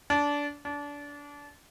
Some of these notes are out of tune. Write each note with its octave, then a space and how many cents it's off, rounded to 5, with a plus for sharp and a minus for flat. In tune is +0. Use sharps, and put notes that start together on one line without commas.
D4 -20
D4 -25